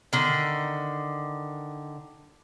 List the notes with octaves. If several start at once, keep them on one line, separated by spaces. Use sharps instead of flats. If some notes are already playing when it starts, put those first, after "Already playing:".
D3 D#3